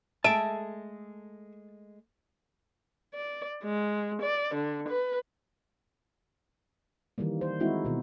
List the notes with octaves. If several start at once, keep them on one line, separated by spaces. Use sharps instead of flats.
G#3 A3 G#4 E5 A5 D7
D5
G#3
D5
D3
B4
D#3 E3 G3 A#3
C5
G#3 C4 D#4 E4 F#4
B2 D#3